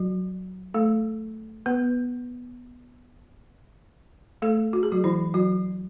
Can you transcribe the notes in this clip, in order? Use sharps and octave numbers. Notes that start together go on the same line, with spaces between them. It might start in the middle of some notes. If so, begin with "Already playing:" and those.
Already playing: F#3 F#4
A3 A4
B3 B4
A3 A4
F#4
G#4
F#3 F#4
E3 E4
F#3 F#4